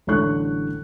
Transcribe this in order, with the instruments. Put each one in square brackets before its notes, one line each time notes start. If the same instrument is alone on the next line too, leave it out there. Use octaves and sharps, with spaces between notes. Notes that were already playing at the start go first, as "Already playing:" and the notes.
[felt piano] A1 D3 G3 C#5 C#6 F#6